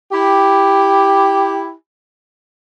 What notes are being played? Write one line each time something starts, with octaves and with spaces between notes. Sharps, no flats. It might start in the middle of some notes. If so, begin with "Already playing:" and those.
E4 G4